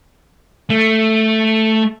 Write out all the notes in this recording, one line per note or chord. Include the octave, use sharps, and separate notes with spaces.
A3